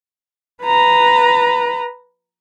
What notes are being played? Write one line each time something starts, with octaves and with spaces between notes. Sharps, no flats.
B4 A#5